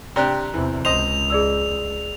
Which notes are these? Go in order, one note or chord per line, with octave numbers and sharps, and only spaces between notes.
C3 D4 G4 A#5 F#6
E2 C3 E3
C#2 C5 D#5 F7
G#4 D5 E6